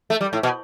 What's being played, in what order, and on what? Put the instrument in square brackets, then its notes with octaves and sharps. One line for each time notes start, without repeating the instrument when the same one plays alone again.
[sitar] A3
G3
A2
B2